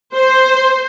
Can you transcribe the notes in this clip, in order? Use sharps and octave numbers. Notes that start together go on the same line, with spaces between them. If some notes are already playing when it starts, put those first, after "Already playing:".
C5